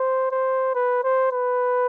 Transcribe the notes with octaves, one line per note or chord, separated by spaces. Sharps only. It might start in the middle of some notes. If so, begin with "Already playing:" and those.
Already playing: C5
C5
B4
C5
B4